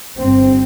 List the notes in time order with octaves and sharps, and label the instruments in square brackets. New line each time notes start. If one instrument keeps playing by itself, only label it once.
[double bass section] G1 G2 C4